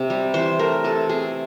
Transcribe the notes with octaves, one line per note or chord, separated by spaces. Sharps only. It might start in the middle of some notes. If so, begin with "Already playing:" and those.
Already playing: C3
G3
E3 C5
A3 A#4
C3 A4
C3 G#4